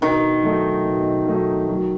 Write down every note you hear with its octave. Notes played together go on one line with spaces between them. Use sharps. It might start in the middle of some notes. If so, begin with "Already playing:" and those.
B2 D#3
F#3 A3 D#4
B2
F#3 A3 D#4
F#3